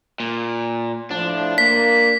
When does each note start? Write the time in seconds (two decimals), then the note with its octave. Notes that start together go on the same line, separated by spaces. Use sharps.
0.20 A#2
1.11 A2 F3 D4
1.58 A#3 B6